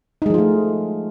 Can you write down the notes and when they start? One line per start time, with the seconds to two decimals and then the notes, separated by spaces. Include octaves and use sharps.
0.22 D#4
0.26 G#3
0.30 F3
0.34 F4
0.38 A3